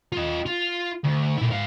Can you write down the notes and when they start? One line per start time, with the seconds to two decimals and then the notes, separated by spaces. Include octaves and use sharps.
0.12 F4 D#5
0.46 F4
1.04 D2
1.37 A#2 E4
1.51 G#2 F5